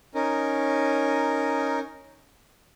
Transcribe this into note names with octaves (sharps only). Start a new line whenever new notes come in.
C#4 D#4 A#4